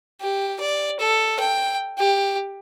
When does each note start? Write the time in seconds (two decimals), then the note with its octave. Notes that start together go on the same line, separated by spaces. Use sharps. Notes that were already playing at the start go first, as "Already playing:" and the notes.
0.21 G4
0.60 D5
1.00 A4
1.40 G5
1.98 G4